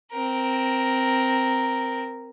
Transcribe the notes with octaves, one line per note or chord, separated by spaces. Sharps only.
C4 A#4